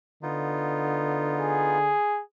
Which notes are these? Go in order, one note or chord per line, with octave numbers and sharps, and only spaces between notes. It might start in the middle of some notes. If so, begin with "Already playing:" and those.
D3 B3 D#4 F4
G#4